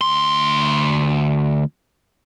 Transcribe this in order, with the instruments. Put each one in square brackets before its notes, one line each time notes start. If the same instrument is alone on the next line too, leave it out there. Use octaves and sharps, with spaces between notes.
[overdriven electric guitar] D2 C6